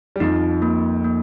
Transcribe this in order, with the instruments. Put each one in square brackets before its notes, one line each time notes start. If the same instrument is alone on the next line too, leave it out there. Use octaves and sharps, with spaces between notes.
[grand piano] G3
[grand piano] F2 F3 [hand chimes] D#4
[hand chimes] A#3
A#3